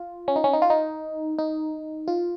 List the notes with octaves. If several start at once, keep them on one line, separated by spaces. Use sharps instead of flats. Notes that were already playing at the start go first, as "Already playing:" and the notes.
Already playing: F4
C#4
D#4
C#4
D#4
F4
D#4
D#4
F4